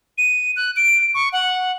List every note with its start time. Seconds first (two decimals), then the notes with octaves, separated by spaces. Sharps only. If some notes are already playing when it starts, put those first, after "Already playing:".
0.18 D#7
0.56 F#6
0.77 D7
1.14 C#6
1.33 F#5